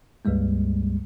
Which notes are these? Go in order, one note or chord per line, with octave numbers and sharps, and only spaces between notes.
C#2 G2 G3 G#3 A#3